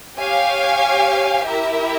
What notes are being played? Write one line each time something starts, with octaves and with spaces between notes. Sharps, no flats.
G4 C#5 F5 G#5
E4 G4 A#4 E5